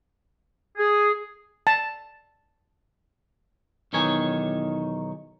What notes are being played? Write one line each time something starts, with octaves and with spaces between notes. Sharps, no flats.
G#4
A5
B1 E2 D#3 D#4 C#5 G#5